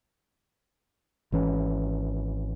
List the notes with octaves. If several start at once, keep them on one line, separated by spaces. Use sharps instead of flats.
G#1 E3 C#4